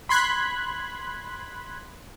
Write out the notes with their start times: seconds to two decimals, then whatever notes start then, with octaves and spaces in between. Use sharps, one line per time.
0.09 B5 C6 F#6 G#6 B6